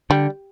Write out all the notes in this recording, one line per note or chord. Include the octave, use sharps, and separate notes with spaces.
D3 G3